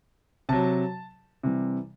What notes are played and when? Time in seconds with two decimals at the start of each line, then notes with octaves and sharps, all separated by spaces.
0.49 C3 F#3 A5
1.43 C3 E3 G3